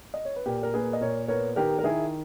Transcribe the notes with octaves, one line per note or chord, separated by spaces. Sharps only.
D#5
C#5
B4
A#2 G4 A#4
A#4
A#3 G#4 B4
D#5
A#2 A#4 C#5
B3 A#4 C#5
D#3 G4 A#4
A#4
D#3 E4 G#4